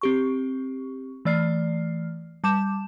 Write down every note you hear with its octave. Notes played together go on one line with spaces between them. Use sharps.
C4 G4 C#6
E3 A3 D5 F6 C7
G3 A5 D6 G6 E7